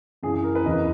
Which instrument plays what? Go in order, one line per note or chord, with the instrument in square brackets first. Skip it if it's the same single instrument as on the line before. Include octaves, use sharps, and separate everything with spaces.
[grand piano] F#2 C#3 E3 G#4
G#4
A#4
B4
E2 C#3 E3 D#5